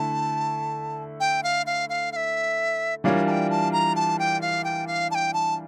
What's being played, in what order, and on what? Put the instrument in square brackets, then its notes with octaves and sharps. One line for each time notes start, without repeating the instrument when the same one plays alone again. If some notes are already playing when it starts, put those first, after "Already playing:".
Already playing: [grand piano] D3 A3 E4 [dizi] A5
[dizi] G5
F5
F5
F5
F5
E5
[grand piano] E3 G3 D4 F4 A#4 [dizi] C#5
[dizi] A5
G5
A5
A#5
A5
G5
F5
G5
F5
A5
G5
A5